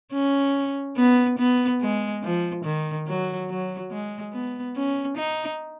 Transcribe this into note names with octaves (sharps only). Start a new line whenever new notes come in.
C#4
B3
B3
G#3
F3
D#3
F#3
F#3
G#3
B3
C#4
D#4